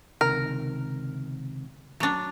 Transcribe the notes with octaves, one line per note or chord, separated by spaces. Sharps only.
C#2 C3 D#3 A#4
F#3 D4